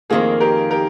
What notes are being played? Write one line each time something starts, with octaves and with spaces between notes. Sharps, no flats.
F2 D#3 A#3 F4 G#4
G4 A#4
G4 A#4